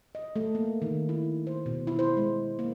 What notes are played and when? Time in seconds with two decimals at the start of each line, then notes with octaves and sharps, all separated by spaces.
0.15 D#5
0.36 A3
0.55 A#3
0.82 D#3
1.09 E4
1.47 C5
1.66 B2
1.87 E4
1.99 C5
2.17 G#3
2.59 A#3